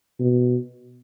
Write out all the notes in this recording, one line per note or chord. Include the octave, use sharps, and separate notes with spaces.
B2